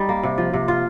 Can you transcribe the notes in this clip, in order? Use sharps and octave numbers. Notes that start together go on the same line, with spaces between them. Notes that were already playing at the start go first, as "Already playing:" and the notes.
Already playing: G3 D#4
A#3
C3
F3
C3
F4